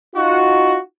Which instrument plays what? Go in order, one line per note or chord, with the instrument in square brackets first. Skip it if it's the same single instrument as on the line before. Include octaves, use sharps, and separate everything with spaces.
[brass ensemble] D#4 F4 F#4